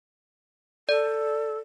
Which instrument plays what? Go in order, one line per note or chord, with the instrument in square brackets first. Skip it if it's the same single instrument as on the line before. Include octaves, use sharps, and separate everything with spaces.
[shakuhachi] A4 [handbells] D5